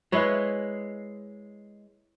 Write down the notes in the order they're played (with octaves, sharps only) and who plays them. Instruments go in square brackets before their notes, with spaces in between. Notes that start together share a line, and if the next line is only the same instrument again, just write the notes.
[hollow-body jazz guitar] G#3 [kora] E4 B4 C#5